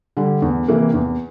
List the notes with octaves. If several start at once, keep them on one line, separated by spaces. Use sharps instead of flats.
D3 G3
E2
C3 E3 A#3
E2